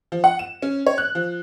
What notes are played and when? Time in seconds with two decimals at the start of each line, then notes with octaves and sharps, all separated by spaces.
0.12 F3
0.24 F#5
0.39 E7
0.62 C#4
0.87 C#5
0.98 F#6
1.15 F3